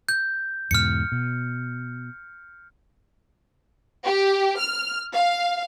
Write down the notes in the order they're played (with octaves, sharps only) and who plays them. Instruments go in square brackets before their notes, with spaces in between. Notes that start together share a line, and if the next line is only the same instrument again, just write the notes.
[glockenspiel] G6
[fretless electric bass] E2 G#2 B2 [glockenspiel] F6 C#7
[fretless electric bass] B2
[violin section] G4
F6
F5